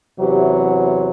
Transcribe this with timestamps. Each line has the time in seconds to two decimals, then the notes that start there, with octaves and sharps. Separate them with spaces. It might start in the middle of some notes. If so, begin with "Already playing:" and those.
0.19 E2 C3 F#3 G4